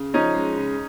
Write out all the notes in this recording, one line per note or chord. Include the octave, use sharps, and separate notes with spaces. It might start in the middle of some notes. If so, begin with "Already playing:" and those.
Already playing: C#3
F3 C#4 D#4
G#3
C#3